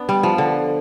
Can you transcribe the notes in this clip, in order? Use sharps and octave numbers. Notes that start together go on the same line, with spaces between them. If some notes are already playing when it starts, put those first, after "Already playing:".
Already playing: B3 D4
G3
F3
D3